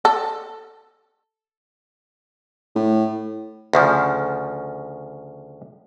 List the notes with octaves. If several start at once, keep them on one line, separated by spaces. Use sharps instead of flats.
A4
A2
D2 C#3 F3